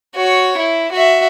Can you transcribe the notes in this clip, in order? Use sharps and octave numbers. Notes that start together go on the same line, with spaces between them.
F#4 C#5
E4
F#4 E5